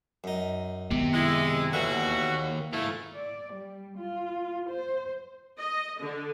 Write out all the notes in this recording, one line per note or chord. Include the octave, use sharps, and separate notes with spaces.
F#2 D#4
C3 D#3 B3
G#3 E4
D#2 B2 D3 E3 E4 F#4
G#2 A3 E4 F4
D5
G3
F4
C5
D#5
D3